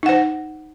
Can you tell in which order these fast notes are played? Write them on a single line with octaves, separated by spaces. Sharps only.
D#4 F#5 C5